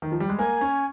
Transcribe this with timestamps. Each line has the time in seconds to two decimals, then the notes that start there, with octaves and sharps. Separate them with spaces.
0.02 D#3
0.12 F3
0.20 G3
0.29 G#3
0.39 A#3 G#5
0.61 C#4